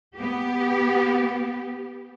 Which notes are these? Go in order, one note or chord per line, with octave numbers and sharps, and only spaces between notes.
B3 G4